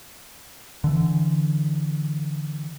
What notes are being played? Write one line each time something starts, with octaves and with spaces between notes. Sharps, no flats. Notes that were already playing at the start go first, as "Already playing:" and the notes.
D3 E3